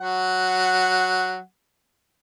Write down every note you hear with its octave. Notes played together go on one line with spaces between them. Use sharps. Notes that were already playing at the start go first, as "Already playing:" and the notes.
F#3 F#5